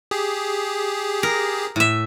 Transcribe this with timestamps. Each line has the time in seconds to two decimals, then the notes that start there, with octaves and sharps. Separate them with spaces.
0.11 G4 G#4
1.23 A#4
1.76 A2 E5